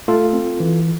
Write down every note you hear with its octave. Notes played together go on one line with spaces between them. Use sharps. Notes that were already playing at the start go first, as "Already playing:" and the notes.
A3 F4 A4
C4
E3